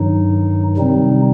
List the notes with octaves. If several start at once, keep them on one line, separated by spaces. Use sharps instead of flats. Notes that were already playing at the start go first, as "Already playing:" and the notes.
Already playing: G2 D#3 F#3 D#4
C3 D#3 G3 C4 D#4